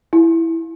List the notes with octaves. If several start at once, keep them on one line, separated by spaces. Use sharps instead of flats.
E4